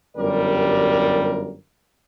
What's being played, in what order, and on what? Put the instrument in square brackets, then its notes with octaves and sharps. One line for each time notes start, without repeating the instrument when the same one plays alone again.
[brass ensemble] G1 F#2 G3 A#4 D5